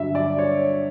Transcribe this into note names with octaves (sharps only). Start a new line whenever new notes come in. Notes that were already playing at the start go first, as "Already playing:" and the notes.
Already playing: G2 D3 F#3 E5
D5
C#5